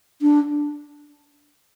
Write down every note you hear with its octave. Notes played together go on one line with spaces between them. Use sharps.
D4